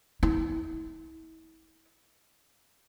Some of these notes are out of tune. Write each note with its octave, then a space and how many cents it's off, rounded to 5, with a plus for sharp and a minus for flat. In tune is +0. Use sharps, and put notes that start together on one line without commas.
E4 -35